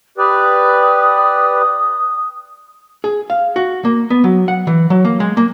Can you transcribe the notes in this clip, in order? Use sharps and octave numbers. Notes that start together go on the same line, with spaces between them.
G4 B4 D5 D#6
G#4
F5
F#4
A#3
B3
F#3
F#5
E3
F#3
A#3
G#3
A#3